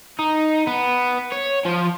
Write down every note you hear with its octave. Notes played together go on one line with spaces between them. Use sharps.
D#4
B3
C#5
F3